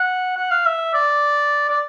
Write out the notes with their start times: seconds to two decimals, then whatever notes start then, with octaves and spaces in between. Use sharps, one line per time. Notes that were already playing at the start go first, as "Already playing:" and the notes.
Already playing: F#5
0.36 F#5
0.51 F5
0.65 E5
0.94 D5
1.69 D5